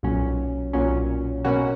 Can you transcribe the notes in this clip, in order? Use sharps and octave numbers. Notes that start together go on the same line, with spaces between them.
B1 A#2 F#3 C#4
B1 A#2 F#3 C#4
B2 A#3 C#4 F#4